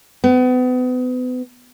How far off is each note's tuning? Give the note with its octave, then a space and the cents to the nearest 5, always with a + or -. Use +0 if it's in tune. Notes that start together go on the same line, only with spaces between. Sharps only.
B3 +35